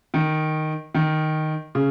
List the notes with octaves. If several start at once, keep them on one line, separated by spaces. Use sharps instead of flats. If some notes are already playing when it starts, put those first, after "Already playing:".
D#3
D#3
C#3